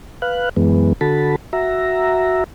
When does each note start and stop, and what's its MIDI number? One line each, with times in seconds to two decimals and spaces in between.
0.22 0.49 71
0.22 0.49 77
0.22 0.49 90
0.56 0.93 42
0.56 0.93 52
0.56 0.93 56
0.56 0.93 59
1.01 1.36 50
1.01 1.36 66
1.01 1.36 69
1.01 1.36 81
1.01 1.36 83
1.53 2.44 66
1.53 2.44 76
1.53 2.44 82